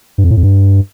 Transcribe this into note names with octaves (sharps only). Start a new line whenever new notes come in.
G2
F2
A2
F2
G2